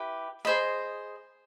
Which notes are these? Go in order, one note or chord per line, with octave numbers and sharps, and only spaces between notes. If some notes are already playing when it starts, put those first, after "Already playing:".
Already playing: E4 G4 B4
G#4 C5 D#5 B5